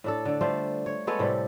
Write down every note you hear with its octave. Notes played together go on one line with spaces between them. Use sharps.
A2 D4 A4
D3 D4
G3 A3 F4 C5
C#5
G#3 B3 A4 C#5
A2 C3 G3